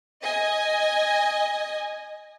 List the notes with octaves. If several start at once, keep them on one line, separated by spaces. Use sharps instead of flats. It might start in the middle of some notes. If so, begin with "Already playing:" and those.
D#5 G#5